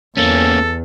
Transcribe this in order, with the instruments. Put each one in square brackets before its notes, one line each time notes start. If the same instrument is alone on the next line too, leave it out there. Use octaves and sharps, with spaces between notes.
[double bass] E2 [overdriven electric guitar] A#3 C#4 [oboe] A4